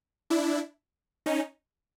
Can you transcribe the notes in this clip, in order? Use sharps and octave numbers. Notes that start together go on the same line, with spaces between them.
D4 E4
C#4 D#4